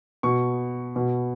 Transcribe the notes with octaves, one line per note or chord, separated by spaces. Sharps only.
B2 C#6
B2